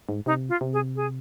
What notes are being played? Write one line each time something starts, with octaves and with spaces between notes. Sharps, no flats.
G#2
C3 D#4
F4
C3
G#4
G#4